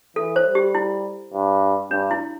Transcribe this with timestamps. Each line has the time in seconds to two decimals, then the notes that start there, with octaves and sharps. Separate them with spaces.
0.16 E3 A4
0.36 C5
0.46 G3
0.55 G4
0.75 E4
1.34 G2
1.91 G2 D4
2.11 E4